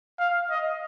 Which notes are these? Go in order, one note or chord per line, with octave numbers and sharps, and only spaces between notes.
F5
D#5